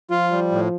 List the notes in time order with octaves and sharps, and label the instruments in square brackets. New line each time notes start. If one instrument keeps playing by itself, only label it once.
[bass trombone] F3 [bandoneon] F4
[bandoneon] G3
A2